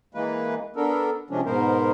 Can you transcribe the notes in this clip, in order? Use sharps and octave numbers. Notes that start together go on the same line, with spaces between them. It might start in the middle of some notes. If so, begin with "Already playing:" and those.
E3 G#3 A#3 B4
B3 D4 A4 A#4
C3 F3 G#3 C#4 D4
G#2 B2 B3 A#4 C5